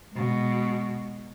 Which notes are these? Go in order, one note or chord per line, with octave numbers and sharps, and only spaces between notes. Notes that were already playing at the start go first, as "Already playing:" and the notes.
B2 G#3